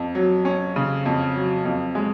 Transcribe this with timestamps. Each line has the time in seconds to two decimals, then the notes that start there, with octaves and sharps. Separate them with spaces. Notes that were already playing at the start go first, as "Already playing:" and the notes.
Already playing: F2
0.15 F#3
0.45 C#4
0.76 C#3
1.06 F2
1.36 F#3
1.65 F2
1.95 G#3